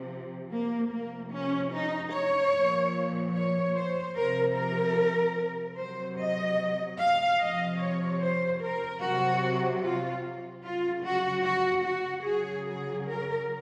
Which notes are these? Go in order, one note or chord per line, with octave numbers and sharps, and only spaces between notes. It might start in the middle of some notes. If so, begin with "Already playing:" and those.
Already playing: C3 F3
A#3
C3 F3 A#3
C#4
D#4
C#5
A#2 F3
C#5
C5
C3 F3 A#4
A#4
C3 F#3 C5
D#5
F5
C3 F3 D#5
C#5
C5
A#4
C3 F#3 F#4
F4
C#3 F#3 F4
F#4
F#4
F#4
C#3 F#3 G#4
G#4
A#4